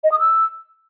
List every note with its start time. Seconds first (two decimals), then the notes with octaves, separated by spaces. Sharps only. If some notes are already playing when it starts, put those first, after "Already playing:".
0.04 D#5
0.12 D#6
0.20 E6